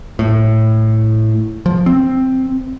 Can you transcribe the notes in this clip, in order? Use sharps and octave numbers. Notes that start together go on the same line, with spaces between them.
A2
F3
C4